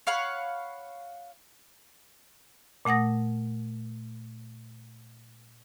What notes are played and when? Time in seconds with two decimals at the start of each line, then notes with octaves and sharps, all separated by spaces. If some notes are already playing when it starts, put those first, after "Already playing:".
0.07 C#5 F5 F#5 B5
2.85 A#2 A3 F#5 D#6 A#6